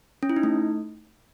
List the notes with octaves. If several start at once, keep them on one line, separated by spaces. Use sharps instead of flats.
C#4
E4
D#4
A3